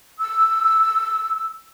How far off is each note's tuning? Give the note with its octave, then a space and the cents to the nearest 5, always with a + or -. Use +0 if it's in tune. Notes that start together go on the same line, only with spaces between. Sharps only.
E6 +0